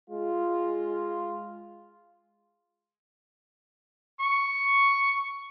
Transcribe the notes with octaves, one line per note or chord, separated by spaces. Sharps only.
G#3 F4
C#6